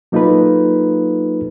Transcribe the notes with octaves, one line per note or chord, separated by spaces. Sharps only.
F#3 A#3 D#4 F4 A4 B4